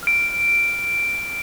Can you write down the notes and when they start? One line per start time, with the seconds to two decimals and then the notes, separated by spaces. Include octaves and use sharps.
0.03 F6 D7